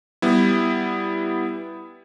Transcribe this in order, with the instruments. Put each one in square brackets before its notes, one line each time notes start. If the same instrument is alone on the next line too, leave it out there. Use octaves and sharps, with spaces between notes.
[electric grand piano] G3 B3 E4